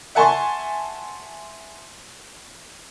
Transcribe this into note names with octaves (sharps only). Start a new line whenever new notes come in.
E5 F#5 G#5 A5 C6 C#6